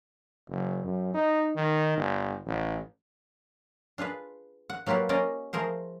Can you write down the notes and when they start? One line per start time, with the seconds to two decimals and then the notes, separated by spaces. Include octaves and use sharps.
0.48 F#1
0.85 F#2
1.14 D#4
1.56 D#3
1.97 G1
2.46 A1
3.98 D4 F4 G#4 B4
4.70 F#5
4.86 F#3 A#3 F4 G4 B4
5.09 A#3 C#4 D5 D#5 F5
5.53 F3 A3 G#4 A#4 C5